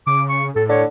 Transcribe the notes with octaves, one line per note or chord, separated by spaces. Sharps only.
C#3 D6
C#6
A2 A4
D3 C#5